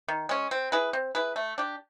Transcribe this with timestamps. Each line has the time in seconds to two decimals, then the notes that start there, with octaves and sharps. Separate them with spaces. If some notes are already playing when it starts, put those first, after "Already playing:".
0.08 D#3
0.29 G#3 C#4
0.51 C4
0.72 E4 G#4 B4
0.93 C4
1.15 E4 G#4 B4
1.36 A3
1.58 D4 G4